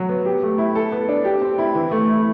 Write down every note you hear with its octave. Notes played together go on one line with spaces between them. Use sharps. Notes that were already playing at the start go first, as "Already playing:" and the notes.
Already playing: F#3 F#4
B3
G4
A3
E4
A4
B3
D4
G4
C4
E4
E3
A3
E4